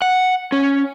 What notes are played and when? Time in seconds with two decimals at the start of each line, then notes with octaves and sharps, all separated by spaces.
0.02 F#5
0.52 C#4